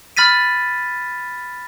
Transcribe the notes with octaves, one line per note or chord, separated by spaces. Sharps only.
B5 F6 A6 B6 D#7